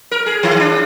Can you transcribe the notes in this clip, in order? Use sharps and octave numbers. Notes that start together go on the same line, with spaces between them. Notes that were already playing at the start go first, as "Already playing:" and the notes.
A#4
G#4
D#3
D4